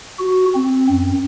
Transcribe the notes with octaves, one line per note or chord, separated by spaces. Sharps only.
F#4
C4
F#2